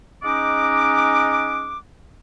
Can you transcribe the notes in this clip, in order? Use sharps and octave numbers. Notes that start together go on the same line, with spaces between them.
G#3 C#4 D#4 D#5 F#5 D6